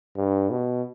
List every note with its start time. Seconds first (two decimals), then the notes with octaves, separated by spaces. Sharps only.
0.16 G2
0.51 B2